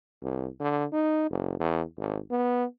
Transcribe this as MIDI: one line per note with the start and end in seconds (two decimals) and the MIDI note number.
0.22 0.47 36
0.60 0.85 50
0.92 1.29 63
1.31 1.57 30
1.60 1.82 40
1.97 2.18 32
2.30 2.65 59